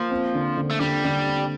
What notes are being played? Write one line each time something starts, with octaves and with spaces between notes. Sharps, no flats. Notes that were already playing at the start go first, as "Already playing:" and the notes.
Already playing: F3 A#3
C4
D3
D3
A3
D3 G3
D3
C4